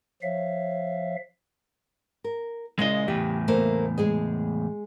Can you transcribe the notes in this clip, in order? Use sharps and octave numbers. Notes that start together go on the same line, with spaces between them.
F3 C#5 E5 F5
A#4
A#2 C#3 G#3 E4 D#5
E2 A2 G4
A3 A#3 C5
G#3 G#4 D#5